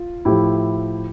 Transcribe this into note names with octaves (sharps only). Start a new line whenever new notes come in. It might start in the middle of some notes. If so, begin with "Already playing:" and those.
Already playing: F4
A2 F3 E4 G4